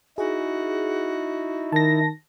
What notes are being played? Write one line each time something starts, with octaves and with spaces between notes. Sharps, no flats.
D#4 E4 F#4 G#4
D#3 A5 A#6